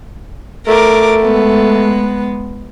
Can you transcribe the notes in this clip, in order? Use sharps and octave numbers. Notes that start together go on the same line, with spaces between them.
A3 A#4 D6
G#3 B3